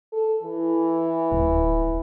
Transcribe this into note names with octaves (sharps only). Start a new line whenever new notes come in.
A4
E3
D1